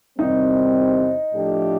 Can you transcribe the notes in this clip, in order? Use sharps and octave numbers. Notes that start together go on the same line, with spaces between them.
E2 C3 D#3 G3 C4 D#4
A2 F3 A3 D4 G4